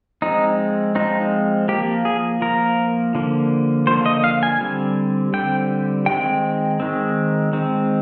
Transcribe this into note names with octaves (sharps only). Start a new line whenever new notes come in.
F3 G#3 C4 D#4
F3 G#3 C4 D#4
F3 A#3 G4
G#4
F3 A#3 A#4
D3 F3 A#3
D3 F3 A#3 C5
D#5
F5
G#5
D3 G3 C4
D3 G3 C4 G5
D#3 G#3 C4 G5
D#3 G#3 C4
D#3 G#3 C4